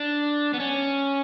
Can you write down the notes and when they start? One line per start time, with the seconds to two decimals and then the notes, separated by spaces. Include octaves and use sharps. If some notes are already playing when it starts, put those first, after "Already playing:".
Already playing: D4
0.54 B3
0.60 C#4